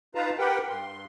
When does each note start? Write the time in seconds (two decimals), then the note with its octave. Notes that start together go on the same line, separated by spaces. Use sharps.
0.15 D#4 F4 B4 F5 A5 A#5
0.38 G4 A#4 B4 F#5 G5
0.70 G2 C6